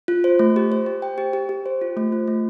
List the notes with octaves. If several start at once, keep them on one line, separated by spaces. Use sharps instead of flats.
F4
C5
A3
G4
C5
G4
G5
G4
G4
G4
C5
F4
A3
F4
A3